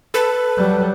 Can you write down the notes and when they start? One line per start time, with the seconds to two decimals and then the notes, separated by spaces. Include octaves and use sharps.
0.14 A4 B4
0.58 F#3 G3